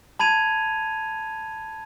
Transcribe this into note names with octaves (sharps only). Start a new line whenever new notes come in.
A5 B5 G#6 D#7 F7